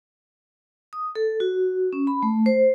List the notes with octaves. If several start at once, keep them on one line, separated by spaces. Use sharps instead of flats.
D#6
A4
F#4
C#4
B5
A3
C5